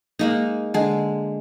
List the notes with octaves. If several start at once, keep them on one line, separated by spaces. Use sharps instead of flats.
G#3 A#3 D#4
D3 G#3